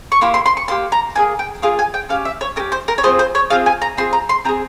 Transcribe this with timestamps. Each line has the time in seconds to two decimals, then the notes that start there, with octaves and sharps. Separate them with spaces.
0.12 C#6
0.21 A#3 E4 G4 C6
0.34 C6
0.46 C6
0.57 C#6
0.68 A#3 E4 G4 C6
0.92 A#5
1.15 A#3 F4 G#4 G#5
1.39 G5
1.62 A#3 F4 G#4 F5
1.79 G#5
1.94 G5
2.09 C#4 G4 F5
2.25 E5
2.41 C#5
2.56 C#4 A#4
2.60 G4
2.72 C5
2.88 A#4
2.98 C#5
3.03 C4 F4 G#4 C5
3.19 C5
3.35 C#5
3.50 C4 F4 G#4 F5
3.66 G#5
3.82 A#5
3.97 C4 F4 G#4 C6
4.13 A#5
4.29 C6
4.45 C4 F4 A#5
4.49 G#4